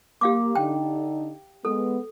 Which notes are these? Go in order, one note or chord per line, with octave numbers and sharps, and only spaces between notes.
A#3 G4 F5 D6
D3 D#4 G5
G#3 B3 A4